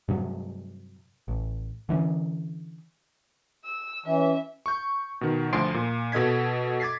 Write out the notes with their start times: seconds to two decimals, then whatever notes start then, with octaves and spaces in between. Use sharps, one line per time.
0.08 G2 C3 F#3
1.28 A1
1.89 D3 E3 C#4
3.64 E6
4.06 E3 C#4 E5
4.66 C#6 G6
5.21 B2 D#3
5.53 D2 F3 C6 C7 D7
5.74 A#2
6.12 B2 A4 D#5 G#6 B6
6.80 D6 G#6 A6 B6 C7